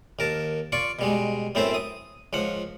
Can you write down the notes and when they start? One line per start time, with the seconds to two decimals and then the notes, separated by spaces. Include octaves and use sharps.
0.19 D#2 A#4 A5
0.72 F4 D5 C#6
0.99 B2 G3 G#3
1.55 F#2 A2 B3 C4 C5 E5
1.74 D#6
2.33 C#2 F3 F#5